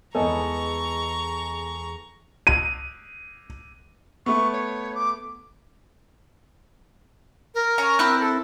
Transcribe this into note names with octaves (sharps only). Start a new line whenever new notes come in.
E2 G#3 B3 A4 D#5 G#5 A#5 C#6
D#7
A3 B3 C#6
C#5
D6
A#4
C#4 C#5 A#5
C4 E4 F#6
A4